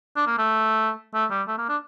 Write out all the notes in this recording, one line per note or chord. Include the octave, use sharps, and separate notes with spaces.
D4
A#3
A3
A3
G3
A3
A#3
D4